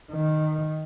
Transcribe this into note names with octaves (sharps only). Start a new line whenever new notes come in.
D#3